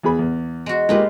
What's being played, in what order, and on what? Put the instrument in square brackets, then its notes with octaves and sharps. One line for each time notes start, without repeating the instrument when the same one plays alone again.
[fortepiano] E2 G#4 B5
E2
[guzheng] G#3 F#4
[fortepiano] G#3 A#3 G4 [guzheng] D#4 F4 B4